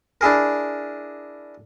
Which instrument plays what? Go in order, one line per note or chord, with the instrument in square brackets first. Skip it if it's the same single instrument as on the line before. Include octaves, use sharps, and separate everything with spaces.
[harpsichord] D4 E4 G#4 A#4